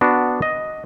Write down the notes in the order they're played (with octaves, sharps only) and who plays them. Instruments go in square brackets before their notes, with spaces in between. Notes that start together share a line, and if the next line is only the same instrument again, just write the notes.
[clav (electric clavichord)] B3 D4 F#4
D#5